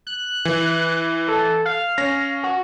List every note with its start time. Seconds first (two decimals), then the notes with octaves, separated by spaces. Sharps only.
0.07 F#6
0.45 E3
1.28 A4
1.65 F5
1.98 C#4 A#6
2.43 F#4